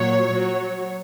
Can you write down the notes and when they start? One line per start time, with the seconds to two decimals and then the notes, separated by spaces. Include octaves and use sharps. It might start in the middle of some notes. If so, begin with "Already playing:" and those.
Already playing: A#2 F#3 C#5
0.31 F#3